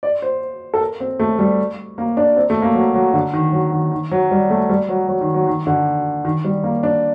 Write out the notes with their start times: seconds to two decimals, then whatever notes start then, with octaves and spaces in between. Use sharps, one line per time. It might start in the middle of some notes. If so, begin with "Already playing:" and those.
0.03 D5
0.22 C5
0.74 A4
0.81 A#4
1.00 C4
1.20 A3
1.39 G3
1.98 A#3
2.17 D4
2.37 C4
2.50 A3
2.62 A#3
2.75 F#3
2.94 F#3
3.14 D3
3.34 D#3
3.52 F#3
3.72 D#3
3.92 D#3
4.11 F#3
4.31 G3
4.50 A3
4.69 G3
4.89 F#3
5.08 F#3
5.21 D#3
5.34 F#3
5.47 D#3
5.67 D3
6.25 D#3
6.44 G3
6.63 A#3
6.83 D4